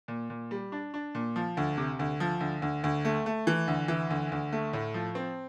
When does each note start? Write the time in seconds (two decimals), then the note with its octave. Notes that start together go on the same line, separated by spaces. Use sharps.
0.08 A#2
0.30 A#2
0.51 G3
0.72 D4
0.94 D4
1.15 A#2
1.36 F3
1.57 D2
1.77 C3
1.99 D2
2.20 F3
2.40 D2
2.62 D2
2.84 D2
3.05 A3
3.26 A3
3.47 E3
3.68 D2
3.88 E3
4.10 D2
4.32 D2
4.52 A3
4.73 A2
4.94 F3
5.15 C4